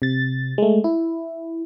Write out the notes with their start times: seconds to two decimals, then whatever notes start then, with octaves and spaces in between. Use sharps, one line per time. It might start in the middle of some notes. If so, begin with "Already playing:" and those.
0.02 C3 A6
0.58 G#3 A3
0.84 E4